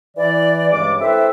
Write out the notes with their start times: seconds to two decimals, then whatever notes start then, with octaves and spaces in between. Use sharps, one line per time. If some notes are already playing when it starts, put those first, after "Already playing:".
0.17 E3 D5
0.72 G2 C#3 G#3 D6
1.00 C4 E4 A4 B4 C5 E5